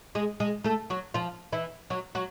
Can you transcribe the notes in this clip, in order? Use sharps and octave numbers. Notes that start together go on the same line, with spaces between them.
G#3 G#4
G#3 G#4
A3 A4
F#3 F#4
F3 F4
E3 E4
F#3 F#4
F#3 F#4